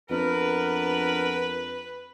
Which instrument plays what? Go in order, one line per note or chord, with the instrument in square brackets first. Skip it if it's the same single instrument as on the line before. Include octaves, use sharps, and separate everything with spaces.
[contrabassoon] F2 [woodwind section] B3 D4 A#4 [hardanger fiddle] B4